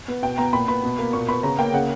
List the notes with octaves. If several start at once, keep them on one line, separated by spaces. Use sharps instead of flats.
B3
B2 G5
B3 A#5
A#2 B5
B3 B5
B2
A#3
A#2 C#6
B3 B5
C#3 A#5
A#3 G5
C#3 F#5